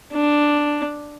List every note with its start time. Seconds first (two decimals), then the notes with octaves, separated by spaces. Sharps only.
0.13 D4